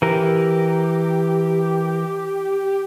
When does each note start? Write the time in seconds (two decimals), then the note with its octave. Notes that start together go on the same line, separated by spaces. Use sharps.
0.02 E3 G4 A#4